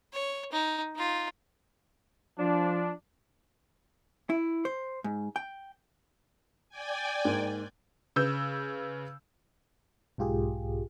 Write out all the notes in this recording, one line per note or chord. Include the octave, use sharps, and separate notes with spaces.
C#5
D#4
D#4 F4
F3 D4
E4
C5
G#2
G5
D5 G5 G#5
G#2 A#3
C#3 B4 E6 G6
B1 G#2 F4 G4 G#4